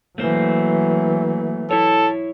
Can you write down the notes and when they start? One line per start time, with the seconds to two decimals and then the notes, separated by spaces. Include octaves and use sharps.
0.18 E3 F#3 A3 A#3 C5
1.71 E4 A4 C#5